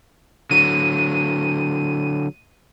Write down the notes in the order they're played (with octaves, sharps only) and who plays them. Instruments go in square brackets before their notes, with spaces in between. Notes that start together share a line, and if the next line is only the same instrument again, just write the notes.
[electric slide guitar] D3 F#3 [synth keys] D#7